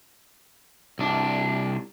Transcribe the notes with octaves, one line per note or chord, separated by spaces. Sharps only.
C2 D4